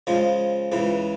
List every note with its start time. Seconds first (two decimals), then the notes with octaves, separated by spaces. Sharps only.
0.07 C#3 F3 G#3
0.72 C#2 C#3 E3